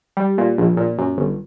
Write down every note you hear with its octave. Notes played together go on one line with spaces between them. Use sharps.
G3
A#2
A#1
A#2
F#2
G1